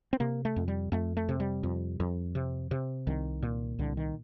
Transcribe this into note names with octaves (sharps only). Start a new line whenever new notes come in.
C4
C3 A#3
A3
F2
G3
F2 A3
A3
C3
G3
F2
F2
C3
C3
C2 D#3
A#2
C2 D3
D#3